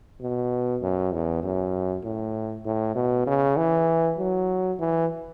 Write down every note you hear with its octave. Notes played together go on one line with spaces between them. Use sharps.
B2
F#2
E2
F#2
A2
A2
B2
C#3
E3
F#3
E3